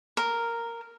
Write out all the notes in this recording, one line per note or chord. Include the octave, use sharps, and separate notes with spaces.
A#4